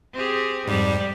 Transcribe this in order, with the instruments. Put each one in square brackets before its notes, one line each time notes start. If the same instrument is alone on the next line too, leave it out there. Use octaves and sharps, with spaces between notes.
[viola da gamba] C4 G4 G#4
[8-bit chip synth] F2 G#2 [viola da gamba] G3